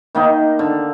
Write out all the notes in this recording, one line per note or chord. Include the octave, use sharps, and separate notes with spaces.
D#3 A#3 D#4
D3